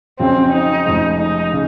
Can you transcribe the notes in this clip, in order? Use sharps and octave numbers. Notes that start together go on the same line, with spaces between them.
F2 C#3 F#3 C4 C#4 F4
D#4
F1 F2 C#3 G#3
D#4
C#3